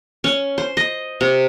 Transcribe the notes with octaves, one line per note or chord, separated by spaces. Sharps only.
C#4
C5
D#5
C3